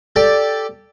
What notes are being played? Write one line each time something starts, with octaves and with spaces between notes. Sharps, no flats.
G4 A4 D5